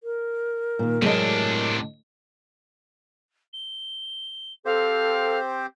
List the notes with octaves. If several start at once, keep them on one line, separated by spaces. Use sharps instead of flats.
A#4
A#2 D#3
A2 C3 F#3 G#3 D4 D#5
G7
C4 G4 A4 C5 F5